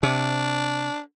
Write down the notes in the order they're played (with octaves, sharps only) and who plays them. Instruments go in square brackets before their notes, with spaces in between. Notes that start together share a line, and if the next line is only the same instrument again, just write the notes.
[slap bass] C3 [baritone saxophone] D4